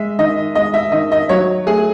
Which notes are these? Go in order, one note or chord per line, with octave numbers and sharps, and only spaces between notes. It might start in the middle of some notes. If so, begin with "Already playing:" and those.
Already playing: G#3 E5
D#3 D#5
G#3 D#5
E5
D#3 D#5
D#5
F#3 C#5
A3 G#4